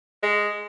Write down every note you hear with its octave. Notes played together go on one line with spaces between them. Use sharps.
G#3